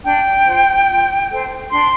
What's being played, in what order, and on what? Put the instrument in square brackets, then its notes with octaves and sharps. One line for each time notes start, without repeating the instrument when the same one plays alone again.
[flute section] D4 G5
F4 C5
F4
A4 C5
D4 C6